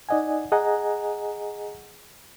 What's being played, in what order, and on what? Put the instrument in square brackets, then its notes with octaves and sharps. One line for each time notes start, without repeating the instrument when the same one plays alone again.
[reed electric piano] D#4 D5 D#5 F#5 G#5
G#4 D#5 F#5 G#5 A#5